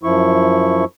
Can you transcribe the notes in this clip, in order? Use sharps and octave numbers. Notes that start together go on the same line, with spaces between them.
F#2 F3 E4 C#6